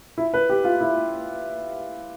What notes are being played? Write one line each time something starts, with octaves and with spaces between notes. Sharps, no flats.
E4
B4
G4
F4
E4